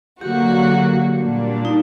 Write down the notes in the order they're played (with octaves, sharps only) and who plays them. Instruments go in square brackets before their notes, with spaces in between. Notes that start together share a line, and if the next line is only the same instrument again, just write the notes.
[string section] D3 F#3 A#3 F#4 [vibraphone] G4
[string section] A#2 G3 A#3 D4
[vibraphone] D#4